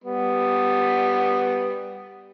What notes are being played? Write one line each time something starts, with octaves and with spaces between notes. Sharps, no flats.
G3 B3